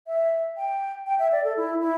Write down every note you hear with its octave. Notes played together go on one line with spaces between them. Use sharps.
E5
G5
G5
E5
D5
A4
E4
E4